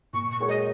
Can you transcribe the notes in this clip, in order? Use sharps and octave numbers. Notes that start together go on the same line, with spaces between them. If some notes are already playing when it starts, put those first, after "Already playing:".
A#2 C#6
C#6
G#3 F#4 A#4 C#5
D#5